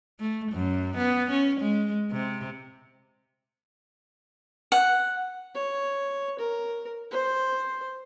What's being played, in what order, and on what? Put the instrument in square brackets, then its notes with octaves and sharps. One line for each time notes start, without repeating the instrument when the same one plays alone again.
[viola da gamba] A3
F#2
B3
C#4
G#3
C3
[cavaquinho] F#5
[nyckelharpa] C#5
A#4
C5